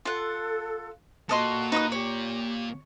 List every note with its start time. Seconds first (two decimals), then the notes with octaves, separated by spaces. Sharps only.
0.05 F4 A4 F#5
1.29 A#2 F#4 A4 D#5 C6
1.72 D#4 B4 D#6
1.92 G4 C#5